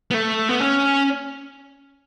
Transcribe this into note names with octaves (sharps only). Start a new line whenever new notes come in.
B3
A3
B3
C#4